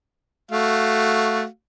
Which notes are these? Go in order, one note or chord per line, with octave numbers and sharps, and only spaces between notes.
A3 F#4 F5